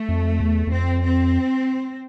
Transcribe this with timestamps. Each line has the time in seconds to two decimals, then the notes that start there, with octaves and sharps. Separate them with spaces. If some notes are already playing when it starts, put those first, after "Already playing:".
Already playing: A3
0.08 F2
0.40 E2
0.67 E2
0.72 F2 C4
1.04 C4